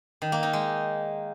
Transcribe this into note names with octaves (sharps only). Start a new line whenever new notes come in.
D#3
A#3
D#4
G#3